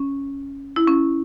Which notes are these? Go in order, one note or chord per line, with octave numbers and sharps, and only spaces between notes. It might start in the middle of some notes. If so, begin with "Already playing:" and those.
Already playing: C#4
E4
C#4